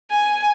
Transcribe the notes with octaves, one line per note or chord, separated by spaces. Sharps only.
G#5